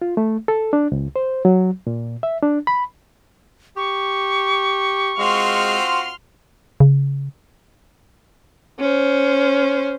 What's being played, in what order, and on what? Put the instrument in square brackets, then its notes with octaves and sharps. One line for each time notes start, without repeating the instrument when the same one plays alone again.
[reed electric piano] F4
A3
A4
D4
C#2
C5
F#3
A#2
E5
D4
B5
[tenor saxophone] G4 [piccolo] C#6
[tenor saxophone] G#3 [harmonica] C4 F4 F#4 [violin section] C6 F6
[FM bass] C#3
[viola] C#4 C5